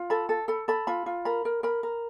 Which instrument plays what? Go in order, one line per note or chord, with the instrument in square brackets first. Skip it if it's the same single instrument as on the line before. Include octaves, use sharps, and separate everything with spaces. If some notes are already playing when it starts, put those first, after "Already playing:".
Already playing: [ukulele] F4
A4 B5
A4
A4 B5
A4 B5
F4 B5
F4
A#4 B5
A#4
A#4 B5
A#4